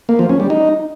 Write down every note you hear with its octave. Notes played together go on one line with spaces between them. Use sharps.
A#3
F3
C#4
G3
D#4